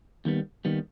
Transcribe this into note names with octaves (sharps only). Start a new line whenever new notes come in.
D#2 D#3 G3 B3
D#2 D#3 G3 B3